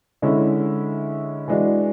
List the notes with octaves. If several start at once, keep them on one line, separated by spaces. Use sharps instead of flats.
D3 G#3 C#4 E4
E3 G#3 D4 F#4